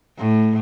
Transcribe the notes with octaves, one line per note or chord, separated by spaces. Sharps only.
A2